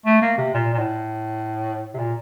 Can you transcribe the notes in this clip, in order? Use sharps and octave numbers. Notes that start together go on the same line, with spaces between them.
A3
A#3
C3
A#2
A#2
A2
C3
A#2